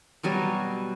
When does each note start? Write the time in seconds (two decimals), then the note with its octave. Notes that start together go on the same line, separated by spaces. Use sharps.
0.23 B2 F#3 G3 G#5